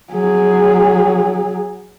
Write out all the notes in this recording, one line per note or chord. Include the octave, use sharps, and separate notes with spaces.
F#3 G#4